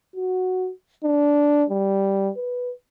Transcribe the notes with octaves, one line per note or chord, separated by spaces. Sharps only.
F#4
D4
G3
B4